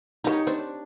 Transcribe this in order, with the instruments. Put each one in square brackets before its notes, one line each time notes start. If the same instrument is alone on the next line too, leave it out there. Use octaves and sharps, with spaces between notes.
[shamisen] D#3 F#3 [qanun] D#4 G4 C#5
[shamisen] C4 C5 C#5 [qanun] D4